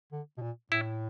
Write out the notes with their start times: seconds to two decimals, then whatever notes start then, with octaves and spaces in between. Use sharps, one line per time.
0.12 D3
0.37 B2
0.42 A#2
0.71 A2 E4